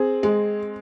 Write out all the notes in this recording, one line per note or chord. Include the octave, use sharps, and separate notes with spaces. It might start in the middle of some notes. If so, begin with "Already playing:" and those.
Already playing: C4 G#4
G#3